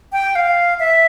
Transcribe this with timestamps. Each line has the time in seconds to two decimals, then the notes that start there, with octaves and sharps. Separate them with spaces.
0.13 G5
0.36 F5
0.80 E5